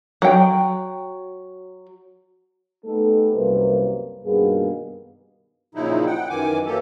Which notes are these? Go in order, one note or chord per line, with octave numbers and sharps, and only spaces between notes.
F#3 G5
A3 B3 D#4 G4 A4
C2 F#2 A#3 C4 B4
G2 B2 D#3 A#3 B3 G#4
A#2 C#3 F3 F#3 D#4 E4
F#5 G5
F#2 D#3 E3 G#5 D6
E3 F#3 A#3 G4 A4